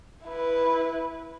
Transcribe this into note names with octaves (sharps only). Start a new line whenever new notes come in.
E4 B4